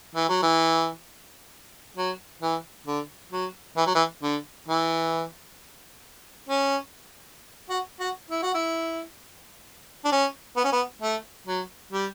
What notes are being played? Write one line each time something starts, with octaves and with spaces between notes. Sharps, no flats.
E3
F#3
E3
F#3
E3
D3
F#3
E3
F#3
E3
D3
E3
C#4
F#4
F#4
E4
F#4
E4
D4
C#4
B3
C#4
B3
A3
F#3
G3